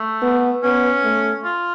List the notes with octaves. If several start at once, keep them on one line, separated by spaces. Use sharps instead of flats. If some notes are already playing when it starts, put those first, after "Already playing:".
Already playing: A3
B3
B3 C#4
A3
F4